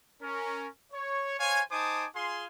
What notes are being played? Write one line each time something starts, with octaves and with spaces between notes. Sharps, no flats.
C#4 A#4
C#5
C5 C#5 F5 G#5
D#4 C5 G#5 A5 D6 D#6
F4 G#4 F5 G#5 C6